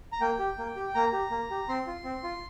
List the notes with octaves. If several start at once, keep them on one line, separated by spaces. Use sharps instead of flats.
A#5
A#3 G5
G4
A#3
G4
A#3 A#5
G4
A#3
G4
C4 C6
F4
C4
F4